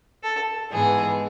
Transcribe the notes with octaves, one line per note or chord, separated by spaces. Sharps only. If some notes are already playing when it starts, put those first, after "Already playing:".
A4
G#2 E3 G#3 B3 G#4